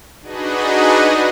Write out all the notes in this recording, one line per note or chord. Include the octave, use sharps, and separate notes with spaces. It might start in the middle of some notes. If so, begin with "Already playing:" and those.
D4 D#4 F#4 G#4 B4 D#5